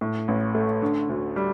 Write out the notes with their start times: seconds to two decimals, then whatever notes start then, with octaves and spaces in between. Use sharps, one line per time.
0.01 A2
0.28 A1
0.55 A3
0.82 D3
1.09 D2
1.36 G3